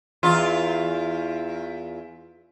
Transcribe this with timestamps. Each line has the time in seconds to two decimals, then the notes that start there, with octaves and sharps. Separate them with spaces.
0.23 E2 F4